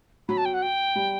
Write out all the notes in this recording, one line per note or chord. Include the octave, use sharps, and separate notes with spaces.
F#3 B5
A5
G5
F#5
G5
G3